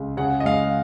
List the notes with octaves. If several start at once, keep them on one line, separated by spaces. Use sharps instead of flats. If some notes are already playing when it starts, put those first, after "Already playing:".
Already playing: C#2
C#3 F#5
D#5
G#3 F5